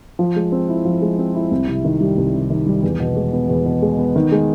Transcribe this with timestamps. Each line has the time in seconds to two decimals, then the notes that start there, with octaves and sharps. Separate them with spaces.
0.19 F3
0.36 G#3
0.52 C4
0.69 E4
0.85 F3
1.02 G#3
1.18 C4
1.35 E4
1.51 C2
1.68 C3
1.85 D#3
2.01 G3
2.17 C2
2.34 C3
2.50 D#3
2.66 G3
2.83 E2
3.00 B2
3.16 G#3
3.33 B3
3.49 E2
3.66 B2
3.82 G#3
3.98 B3
4.16 D#3
4.32 G#3